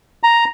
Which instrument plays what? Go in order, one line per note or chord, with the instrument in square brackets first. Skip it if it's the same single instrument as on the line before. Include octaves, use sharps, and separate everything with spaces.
[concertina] A#5